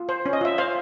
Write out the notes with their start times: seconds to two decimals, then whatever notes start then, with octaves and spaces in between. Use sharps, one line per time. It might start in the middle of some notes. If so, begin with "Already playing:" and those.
Already playing: F4
0.09 C5
0.26 C#4
0.33 D#5
0.41 F4 E5
0.58 C5 F5